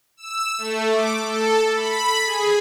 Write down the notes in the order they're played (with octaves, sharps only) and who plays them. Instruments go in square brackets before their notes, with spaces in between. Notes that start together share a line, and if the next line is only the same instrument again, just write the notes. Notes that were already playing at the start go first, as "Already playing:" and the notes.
[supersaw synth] E6
A3
D6
A4
B5
G#4